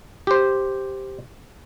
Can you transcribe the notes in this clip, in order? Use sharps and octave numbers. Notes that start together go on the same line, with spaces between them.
G4 C5